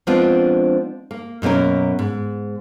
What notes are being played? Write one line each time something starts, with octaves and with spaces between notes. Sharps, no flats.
F3 G#3 B3 C4 D4 F4
A#3
F#2 B2 A#3 C#4 A#4
G#2